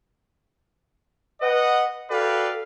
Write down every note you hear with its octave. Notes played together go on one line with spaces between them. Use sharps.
B4 D#5 F#5
F#4 A4 B4 D5 F5 G5